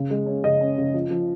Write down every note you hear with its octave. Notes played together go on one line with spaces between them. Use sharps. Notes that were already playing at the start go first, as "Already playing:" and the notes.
Already playing: C#3
G#3
C#4
C#3 D#5
C#4
C#3
F3
F3